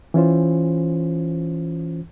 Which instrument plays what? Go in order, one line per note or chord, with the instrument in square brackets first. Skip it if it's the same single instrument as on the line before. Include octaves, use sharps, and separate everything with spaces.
[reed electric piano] E3 C#4 F4 C5